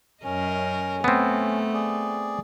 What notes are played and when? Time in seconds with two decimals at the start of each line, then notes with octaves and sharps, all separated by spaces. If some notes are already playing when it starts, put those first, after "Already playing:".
0.23 F#2 C#4 A#4 D#5
1.04 A3 B3 C4
1.74 G#4 D5